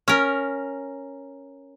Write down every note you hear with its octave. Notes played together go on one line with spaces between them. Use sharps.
C#4 A#4